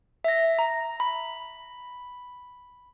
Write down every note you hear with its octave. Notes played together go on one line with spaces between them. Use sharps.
E5 A#6
A#5
B5